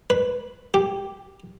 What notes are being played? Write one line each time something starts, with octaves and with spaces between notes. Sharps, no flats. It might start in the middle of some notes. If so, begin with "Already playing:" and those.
B4
G4